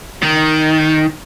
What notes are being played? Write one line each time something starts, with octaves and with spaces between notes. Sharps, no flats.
D#3